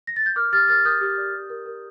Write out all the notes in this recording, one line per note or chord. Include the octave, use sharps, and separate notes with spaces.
A#6
A6
G6
A#4 D6 F6
G4 F6 A6
A#4 F6 A6
A#4 D#6 G6
G4
D5
G4
A#4
A#4